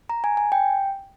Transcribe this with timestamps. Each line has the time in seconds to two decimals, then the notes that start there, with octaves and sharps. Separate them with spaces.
0.09 A#5
0.24 G#5
0.37 G#5
0.52 G5